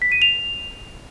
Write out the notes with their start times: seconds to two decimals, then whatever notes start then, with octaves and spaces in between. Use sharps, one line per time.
0.02 B6
0.12 D#7
0.22 F7